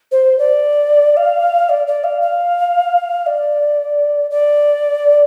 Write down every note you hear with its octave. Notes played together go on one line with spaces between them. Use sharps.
C5
D5
F5
D5
D5
F5
F5
D5
D5